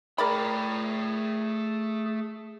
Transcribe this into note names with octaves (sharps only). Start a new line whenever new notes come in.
A3 G#4 A#4 D5 G5 B5